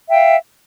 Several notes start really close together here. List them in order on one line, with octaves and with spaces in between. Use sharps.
E5 G5 F5